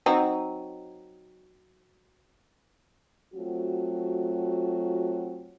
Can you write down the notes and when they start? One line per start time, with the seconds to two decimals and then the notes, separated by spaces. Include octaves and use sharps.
0.06 F#3 C4 D#4
3.34 F#3 A3 C4 F4 F#4